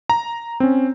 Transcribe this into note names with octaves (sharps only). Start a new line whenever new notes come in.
A#5
C4 C#4